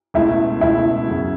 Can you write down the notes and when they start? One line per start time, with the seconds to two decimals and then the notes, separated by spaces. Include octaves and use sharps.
0.14 C#2 B2 A3 E4
0.61 C#2 B2 A3 E4
1.08 F#2 C#3 F#3